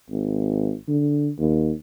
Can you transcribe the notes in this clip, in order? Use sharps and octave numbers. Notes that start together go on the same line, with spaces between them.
G#1
D3
D#2